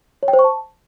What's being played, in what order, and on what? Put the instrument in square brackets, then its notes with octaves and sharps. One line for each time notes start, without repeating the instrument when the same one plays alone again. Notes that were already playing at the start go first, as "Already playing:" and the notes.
[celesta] C#5
G5
C5
C#6
A5